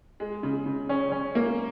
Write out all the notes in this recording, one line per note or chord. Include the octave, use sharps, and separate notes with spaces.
G#3
C#3
C#3
C#4
C#4
A#3